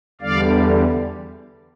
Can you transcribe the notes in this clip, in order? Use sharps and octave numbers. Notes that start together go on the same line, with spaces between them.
E2 D3 G3 D5 F5